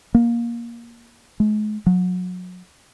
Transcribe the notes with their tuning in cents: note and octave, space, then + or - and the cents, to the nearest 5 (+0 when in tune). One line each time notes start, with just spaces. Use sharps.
A#3 +15
G#3 +40
F#3 -30